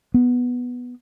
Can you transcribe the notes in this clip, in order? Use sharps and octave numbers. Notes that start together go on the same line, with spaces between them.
B3